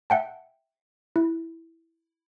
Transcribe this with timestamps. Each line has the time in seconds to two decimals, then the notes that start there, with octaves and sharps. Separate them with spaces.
0.10 E5 F#5 G5 A5
1.16 E4